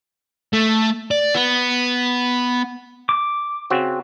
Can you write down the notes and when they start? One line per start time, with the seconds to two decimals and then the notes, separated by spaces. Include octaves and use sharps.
0.53 A3
1.11 D5
1.35 B3
3.09 D6
3.70 C#3 C4 F#4